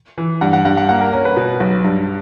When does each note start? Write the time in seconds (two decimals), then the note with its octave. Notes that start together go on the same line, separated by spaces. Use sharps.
0.18 E3
0.41 G2 F#5
0.53 F#5
0.65 G2 F#5
0.77 F#5
0.89 A#3 F#5
1.01 A#4
1.13 C#4 A#4
1.25 B4
1.36 B2
1.60 B1
1.84 G2